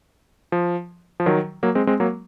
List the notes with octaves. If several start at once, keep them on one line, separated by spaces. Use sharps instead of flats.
F3
F3
D#3 F#3
F#3 A#3
G#3 C4
G#3 C4
F#3 A#3